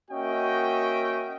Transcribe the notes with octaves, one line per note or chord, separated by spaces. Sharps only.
A#3 C#4 F#4 D#5 E5 G5